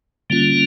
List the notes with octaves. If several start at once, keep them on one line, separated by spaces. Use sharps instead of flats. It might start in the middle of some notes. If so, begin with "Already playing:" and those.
D3 G3 A#3 C#4 F4